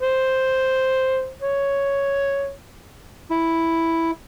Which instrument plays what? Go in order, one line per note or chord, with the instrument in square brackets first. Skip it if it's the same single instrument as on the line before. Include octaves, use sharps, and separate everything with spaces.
[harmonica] C5
C#5
[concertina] E4